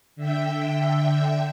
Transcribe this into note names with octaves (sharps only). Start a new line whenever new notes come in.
D3 E5 G5